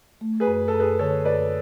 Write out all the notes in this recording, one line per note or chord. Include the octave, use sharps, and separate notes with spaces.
A3
G#4 B4
F#2
A4
F#2
G#4 B4
D3 A4 C#5
F#2 B4 D5